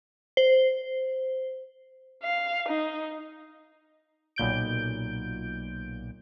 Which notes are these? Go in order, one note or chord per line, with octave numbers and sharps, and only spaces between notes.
C5
F5
D#4
B1 A#2 G6 D7